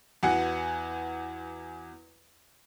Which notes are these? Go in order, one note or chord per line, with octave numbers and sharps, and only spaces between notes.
E2 B3 F#4 F#5 G#5 C#7